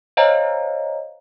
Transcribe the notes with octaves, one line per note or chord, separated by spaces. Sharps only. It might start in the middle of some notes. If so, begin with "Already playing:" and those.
C5 C#5 D#5 F5 G#5 A#5